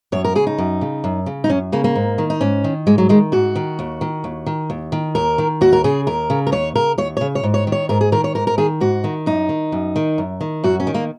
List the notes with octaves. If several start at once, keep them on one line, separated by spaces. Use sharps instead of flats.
F#2 C#5
A#4
C#3 G#4
D#4
F#2
C#3
F#2
C#3
D#4
F#2 C#4
C#3 A#3
A#3
G#2
D#3
D#4
G#2 C#4
D#3
G#2 G#3
F#3
D#3 G#3
G#2 F#4
D#3
D#2
D#3
D#2
D#3
D#2
D#3
D#2 A#4
D#3
D#2 F#4
A#4
C#3 G#4
D#2 A#4
C#3
A#4
D#2 C#5
C#3 A#4
D#2 C#5
C#5
C#3
C#5
G#2
C#5
D#3
C#5
G#2 A#4
G#4
D#3 A#4
C#5
G#2 A#4
A#4
D#3 G#4
G#2 F#4
D#3
F#2 D#4
D#3
F#2
D#3
F#2
D#3
F#2 F#4
C#4
D#3
A#3